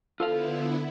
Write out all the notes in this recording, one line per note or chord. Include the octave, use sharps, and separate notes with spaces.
D3 B3 E4 F4 A4 C5 F5